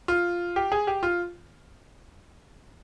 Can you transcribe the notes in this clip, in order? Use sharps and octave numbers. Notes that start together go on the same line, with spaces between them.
F4
G4
G#4
G4
F4